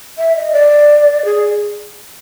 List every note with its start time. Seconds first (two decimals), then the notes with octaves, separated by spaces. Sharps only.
0.18 E5
0.36 D#5
0.52 D5
1.25 G#4